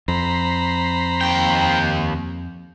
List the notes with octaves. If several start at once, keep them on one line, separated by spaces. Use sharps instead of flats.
F2 C5 A#5 B5
D#2 G5